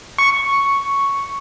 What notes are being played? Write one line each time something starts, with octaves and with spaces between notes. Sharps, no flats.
C#6